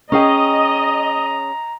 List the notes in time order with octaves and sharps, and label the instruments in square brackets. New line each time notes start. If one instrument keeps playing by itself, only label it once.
[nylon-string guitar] C#4 G#4 G5 [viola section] D#5 [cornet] A#5